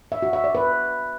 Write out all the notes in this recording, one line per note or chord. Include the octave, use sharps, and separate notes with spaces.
E5
F#4
E5
D5
B4